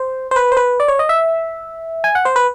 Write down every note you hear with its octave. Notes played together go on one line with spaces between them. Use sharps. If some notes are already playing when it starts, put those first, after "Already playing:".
Already playing: C5
C5
B4
C5
B4
D5
C#5
D#5
E5
G#5
F#5
C5
B4